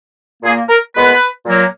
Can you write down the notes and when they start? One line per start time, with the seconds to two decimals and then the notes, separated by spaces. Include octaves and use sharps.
0.43 A#2 A#3 G#4
0.69 A#4
0.95 A#2 G#3 B3 B4
1.45 A#2 F#3 A#3